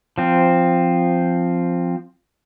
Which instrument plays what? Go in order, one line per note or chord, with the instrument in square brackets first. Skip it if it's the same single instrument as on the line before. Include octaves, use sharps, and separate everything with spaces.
[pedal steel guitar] F3 C4